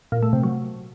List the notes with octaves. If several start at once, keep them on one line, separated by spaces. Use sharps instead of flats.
A#2
A3
C3
F#3